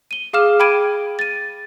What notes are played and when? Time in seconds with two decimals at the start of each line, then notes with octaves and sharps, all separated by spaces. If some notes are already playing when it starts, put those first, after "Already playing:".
0.11 D#7 G7
0.33 G#4 F5 D6 F6 E7
0.59 G5 B5 D6 G#6 D7 D#7
1.19 A6 D#7